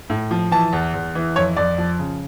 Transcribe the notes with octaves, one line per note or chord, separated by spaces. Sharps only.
A2
F3
E3 A5
E2
E2
E3
F2 C#5
F2 D5
F3
C#3